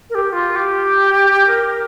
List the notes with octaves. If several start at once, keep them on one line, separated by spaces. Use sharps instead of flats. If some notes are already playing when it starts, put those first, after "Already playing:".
A#4
G4
F4
G4
A#4